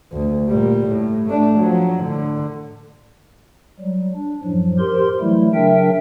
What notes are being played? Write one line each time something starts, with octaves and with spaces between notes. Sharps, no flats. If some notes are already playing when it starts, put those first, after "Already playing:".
D2
A#2 G3
A2
A3 D4
F3 F#3
A2 D3
F#3 G3
D4
F#2 A2 F3 F#3
G4 A#4 C5 C6
E3 F#3 G3 A3 E4
C#3 F#3 D4 A#4 E5 G5